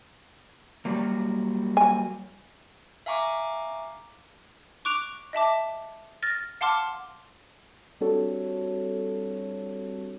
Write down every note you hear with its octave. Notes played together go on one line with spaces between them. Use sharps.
F#3 G3 A#3
G#5
E5 F5 G#5 A#5 C#6 D6
C#6 D6 F#6 D7 F7
D#5 E5 A5 D6
F6 A6 A#6
F5 F#5 A5 C6 D6 F6
G3 C4 D4 F#4 A4 C#5